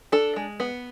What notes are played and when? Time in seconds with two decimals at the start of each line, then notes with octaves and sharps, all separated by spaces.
0.12 D4 A4
0.36 G#3
0.60 B3